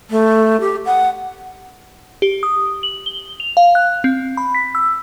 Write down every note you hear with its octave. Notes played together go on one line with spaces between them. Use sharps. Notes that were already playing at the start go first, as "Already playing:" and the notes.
A3
G4
F#5
G4
D#6
F#7
G7
F7
F5
F#6
C4
B5
B6
E6